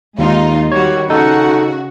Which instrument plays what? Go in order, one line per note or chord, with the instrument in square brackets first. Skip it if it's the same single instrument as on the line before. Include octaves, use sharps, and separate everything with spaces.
[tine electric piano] D#2 [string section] G#3 D#4 F4
[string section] D#3 G3 F#4 [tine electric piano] C#5
[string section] C#3 F#4 [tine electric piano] D#4 A4